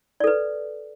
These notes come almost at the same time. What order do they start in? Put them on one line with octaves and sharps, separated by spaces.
D5 A4 B4